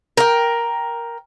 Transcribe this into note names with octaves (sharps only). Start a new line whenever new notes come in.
A#4 G5